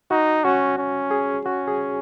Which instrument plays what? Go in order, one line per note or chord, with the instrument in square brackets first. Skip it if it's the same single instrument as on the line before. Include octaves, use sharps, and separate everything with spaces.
[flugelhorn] D#4 [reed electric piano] F#4
[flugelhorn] C#4 [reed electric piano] F#4
[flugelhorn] C#4
[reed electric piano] G#4
[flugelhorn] C#4 [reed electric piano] F#4
[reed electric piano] G#4